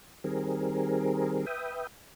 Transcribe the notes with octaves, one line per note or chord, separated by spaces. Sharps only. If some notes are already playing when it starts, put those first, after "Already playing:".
D#3 G3 C4 G#4 A#4
B4 E5 G5 D#6